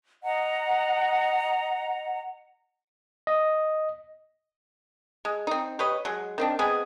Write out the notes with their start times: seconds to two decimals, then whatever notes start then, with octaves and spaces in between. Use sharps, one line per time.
0.23 D#5 F#5 A#5
3.27 D#5
5.25 G#3
5.47 C4 D#4
5.79 G4 B4 C#5 D#5
6.05 F#3 G#3
6.38 D#3 C4 D4
6.59 G#3 B3 C4 G#4